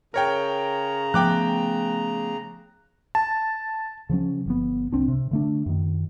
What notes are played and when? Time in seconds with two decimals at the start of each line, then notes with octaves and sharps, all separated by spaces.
0.14 C#3 A#4 C#5 G5 A#5
1.14 F3 A3 B3 G5 D6 F#6
3.15 A5
4.09 C#3 F3 F#3 C#4
4.46 G1 F3 B3
4.92 C2 C4 D4
5.08 C3
5.31 D3 A3 D4
5.66 F#2 D#3